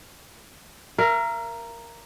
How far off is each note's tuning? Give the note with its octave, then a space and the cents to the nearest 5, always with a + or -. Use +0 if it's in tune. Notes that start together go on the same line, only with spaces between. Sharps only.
A#4 +0 E5 +45